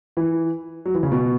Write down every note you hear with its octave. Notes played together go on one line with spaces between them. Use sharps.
E3
F#3
E3
C#3
B2